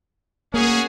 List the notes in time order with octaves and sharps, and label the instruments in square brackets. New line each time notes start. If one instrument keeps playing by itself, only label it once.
[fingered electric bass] A#3 [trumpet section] C#4 F#4 G#4